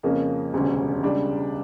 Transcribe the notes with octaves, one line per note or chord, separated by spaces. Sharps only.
F2 C#3 F3 A#3 C#4
E1 D2 C#3 G3 C#4
C#2 C#3 G3 D4